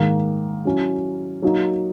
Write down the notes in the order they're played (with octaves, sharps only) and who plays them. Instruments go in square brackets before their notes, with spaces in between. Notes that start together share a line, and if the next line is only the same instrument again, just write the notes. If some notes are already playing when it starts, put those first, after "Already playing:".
Already playing: [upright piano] G#2 D#3 A#3
F#3 C#4 E4
F#3 A#3 D#4